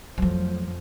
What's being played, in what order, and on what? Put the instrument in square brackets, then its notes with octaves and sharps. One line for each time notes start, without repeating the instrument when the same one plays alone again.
[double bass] F2 F3 [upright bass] F#3 A3